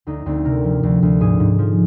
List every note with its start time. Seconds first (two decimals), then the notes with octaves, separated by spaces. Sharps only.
0.07 D2 D#4
0.26 D2 C4
0.45 C3 A#4
0.64 F3
0.83 D2
1.03 D2
1.20 G#2 G#4
1.40 G#2
1.59 F3